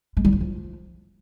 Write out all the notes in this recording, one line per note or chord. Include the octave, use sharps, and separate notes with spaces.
G#3
G3
F#3
F3